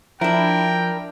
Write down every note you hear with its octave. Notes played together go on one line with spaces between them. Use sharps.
F3 D4 E4 A#4 G5